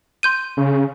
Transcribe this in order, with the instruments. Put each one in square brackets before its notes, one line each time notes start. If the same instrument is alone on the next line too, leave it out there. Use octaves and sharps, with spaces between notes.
[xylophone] C6 G6 D#7
[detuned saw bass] C#3